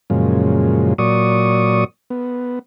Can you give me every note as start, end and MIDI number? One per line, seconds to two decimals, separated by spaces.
0.10 0.94 42
0.10 0.94 46
0.10 0.94 49
0.10 0.94 53
0.10 0.94 56
0.98 1.84 46
0.98 1.84 54
0.98 1.84 74
0.98 1.84 85
0.98 1.84 87
2.10 2.59 59